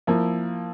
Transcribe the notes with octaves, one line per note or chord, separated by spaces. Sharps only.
F3 A#3 E4